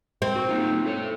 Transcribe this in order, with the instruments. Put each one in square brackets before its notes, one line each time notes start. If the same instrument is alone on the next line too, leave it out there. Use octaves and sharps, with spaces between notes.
[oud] C4
[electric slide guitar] F#4
A#3 D#4 F4
E4 A4 C#5